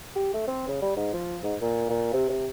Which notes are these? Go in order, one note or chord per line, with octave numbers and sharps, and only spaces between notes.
G4
A3
C4
C#3
G3
G#2
F3
G#2
A#2
A#2
C3
C3